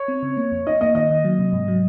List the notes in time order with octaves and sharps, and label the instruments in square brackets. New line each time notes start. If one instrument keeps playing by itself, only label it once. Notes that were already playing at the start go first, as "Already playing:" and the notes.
Already playing: [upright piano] C#5
[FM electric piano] C4
C#3
A#3
F2
[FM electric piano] D#4 [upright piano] D#5
[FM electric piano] A#3 [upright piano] D#5
[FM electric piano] D#3 [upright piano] D#5
[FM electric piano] D#3
F#3
C3
G#2
F#3